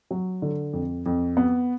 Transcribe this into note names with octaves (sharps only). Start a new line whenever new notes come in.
F#3
D3
F2
F2
B3